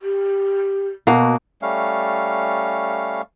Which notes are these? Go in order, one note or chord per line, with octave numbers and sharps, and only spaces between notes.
G4
B2 A#3 F#4
G3 A3 C#4 F5